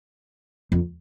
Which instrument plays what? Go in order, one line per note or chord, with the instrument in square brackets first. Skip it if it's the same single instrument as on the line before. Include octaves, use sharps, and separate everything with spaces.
[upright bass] F2